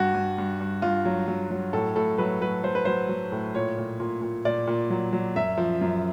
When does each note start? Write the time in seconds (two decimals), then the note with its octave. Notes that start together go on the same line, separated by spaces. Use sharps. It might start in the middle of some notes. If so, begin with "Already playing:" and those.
Already playing: G2 F#4
0.14 G2
0.38 G2
0.61 G2
0.82 G2 F4
1.05 F#3
1.28 F#3
1.51 F#3
1.73 A2 A4
1.96 A2 A4
2.18 F#3 B4
2.41 F#3 B4
2.63 F#3 C5
2.75 B4
2.85 F#3 C5
3.09 F#3
3.32 A2
3.54 A#2 C#5
3.78 A#2
4.00 A#2
4.22 A#2
4.45 A#2 D5
4.67 A#2
4.90 F#3
5.13 F#3
5.36 F#2 E5
5.57 F3
5.81 F#2